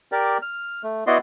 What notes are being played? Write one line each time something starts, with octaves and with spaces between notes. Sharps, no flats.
G4 A#4 D5
F6
A3
B3 E4 F#4 D5 D#5 C6